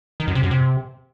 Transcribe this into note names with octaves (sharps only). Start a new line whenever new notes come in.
D#3
F#2
C3
F#2
C3